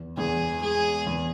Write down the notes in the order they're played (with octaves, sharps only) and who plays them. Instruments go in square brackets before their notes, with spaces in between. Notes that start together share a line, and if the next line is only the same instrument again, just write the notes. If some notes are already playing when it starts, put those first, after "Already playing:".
Already playing: [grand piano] E2
[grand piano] E2 [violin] G#4
[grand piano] G#3 [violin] G#4
[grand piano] E2